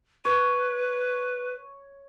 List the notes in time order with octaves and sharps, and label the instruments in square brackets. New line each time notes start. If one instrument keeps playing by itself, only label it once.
[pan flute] B4 [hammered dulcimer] C#5